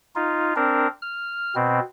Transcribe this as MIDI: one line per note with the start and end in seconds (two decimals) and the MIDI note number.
0.16 0.54 63
0.16 0.54 65
0.56 0.88 60
0.56 0.88 62
0.56 0.88 70
1.02 1.55 89
1.55 1.80 47
1.55 1.80 60